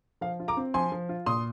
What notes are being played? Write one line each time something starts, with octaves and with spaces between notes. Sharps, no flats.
F3 F5
F4
A#5 D6
C4
F3 G#5 C6
F3
F4
A#2 C6 D#6